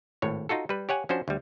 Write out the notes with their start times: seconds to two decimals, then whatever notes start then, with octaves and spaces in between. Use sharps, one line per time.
0.22 G#1 A2 C#5
0.49 D#4 F4 F#4 A4
0.69 G3 B4
0.89 G4 C#5 F#5 G#5
1.09 F3 C#4 D4 F#4 C5
1.28 D2 G3